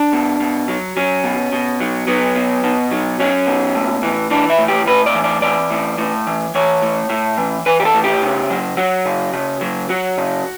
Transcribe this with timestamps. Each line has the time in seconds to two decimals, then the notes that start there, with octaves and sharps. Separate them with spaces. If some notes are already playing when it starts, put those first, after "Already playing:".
Already playing: D4
0.13 B2
0.40 B2
0.68 F#3
0.97 F#3 C#4
1.24 B2
1.53 B2
1.80 F#3
2.07 F#3 B3
2.36 B2
2.64 B2
2.91 F#3
3.20 F#3 C#4
3.47 B2
3.75 A2
4.03 E3
4.31 E3 D4
4.50 E4
4.59 A2
4.68 G4
4.87 A2 B4
5.06 D5
5.15 E3
5.24 D5
5.42 E3 D5
5.71 A2
5.98 A2
6.27 E3
6.55 E3 C#5
6.82 A2
7.10 A2
7.38 E3
7.66 E3 B4
7.80 G4
7.85 A4
7.94 A2
8.04 G4
8.23 C#3
8.50 F#3
8.77 F#3 F#4
9.05 C#3
9.33 C#3
9.61 F#3
9.89 F#3 F#4
10.17 C#3